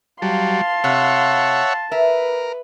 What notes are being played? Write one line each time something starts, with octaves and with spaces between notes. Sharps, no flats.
F#3 G3 F5 A5 C6
C3 C#5 E5 F#5
A#4 B4 E5